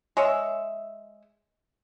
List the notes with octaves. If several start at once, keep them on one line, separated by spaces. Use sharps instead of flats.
G#3 C#5 E5